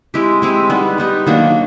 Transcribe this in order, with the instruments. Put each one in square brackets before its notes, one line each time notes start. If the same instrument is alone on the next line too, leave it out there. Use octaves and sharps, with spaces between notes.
[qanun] G#3 C4 E4 G4
G#3 C4 E4 G4
G3 B3 D#4
G3 B3 D#4
D#3 F#3 A#3 D4